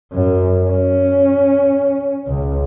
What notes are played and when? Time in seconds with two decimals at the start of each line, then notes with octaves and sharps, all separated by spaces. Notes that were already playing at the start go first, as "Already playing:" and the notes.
0.13 F#2
0.68 C#4
2.27 C#2